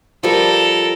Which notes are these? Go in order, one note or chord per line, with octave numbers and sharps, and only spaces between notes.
F3 G3 A4 A#4